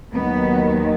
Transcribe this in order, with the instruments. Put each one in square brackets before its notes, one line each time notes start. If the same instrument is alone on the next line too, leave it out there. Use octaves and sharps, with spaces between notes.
[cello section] D#2 D#3 F#3 B3